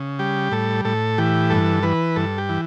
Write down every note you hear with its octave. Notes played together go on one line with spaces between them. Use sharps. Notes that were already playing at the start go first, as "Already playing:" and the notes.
Already playing: C#3
G3 G4
A2 A4
A2 A4
E3 G4
G2 A4
E3 B4
G2 A4
G4
E3